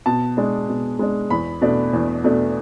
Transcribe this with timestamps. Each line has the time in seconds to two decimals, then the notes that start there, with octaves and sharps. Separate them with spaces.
0.06 B2 A5
0.37 G#3 D4
0.69 B2
0.99 G#3 D4
1.30 E2 B5
1.61 B2 A3 D4
1.93 E2
2.24 B2 A3 D4